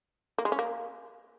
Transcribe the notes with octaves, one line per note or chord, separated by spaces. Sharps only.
A#3
G#3
C#4
A#3